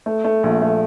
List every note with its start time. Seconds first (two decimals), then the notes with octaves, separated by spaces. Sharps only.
0.06 A3
0.24 A3
0.43 A#1
0.62 A3